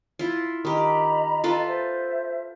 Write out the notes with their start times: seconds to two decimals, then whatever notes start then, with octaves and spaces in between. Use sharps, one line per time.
0.19 E4 F4
0.65 D#3 G4 D#5 A#5 B5
1.44 F4 A4 B4
1.65 C5 E5